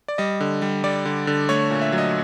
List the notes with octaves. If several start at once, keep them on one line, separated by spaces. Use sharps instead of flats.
D5
G3 D#5
D3
G3
G3 D5
D3
D3
A3 C#5
A#2
E5
F#3
D#5